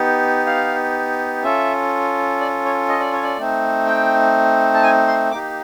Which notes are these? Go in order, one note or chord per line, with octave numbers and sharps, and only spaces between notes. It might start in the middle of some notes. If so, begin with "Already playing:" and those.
Already playing: B3 D#4 G4
F5
C#4 F4 A4 E5
D5
C#5
D#5
D5
C#5
D5
A3 C4 D#4
G5
A5
G#5
C6
A#3 D#4 G4 D6